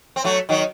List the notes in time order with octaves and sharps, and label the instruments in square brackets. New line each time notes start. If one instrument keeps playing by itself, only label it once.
[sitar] C4
F#3 A3
D#3 F#3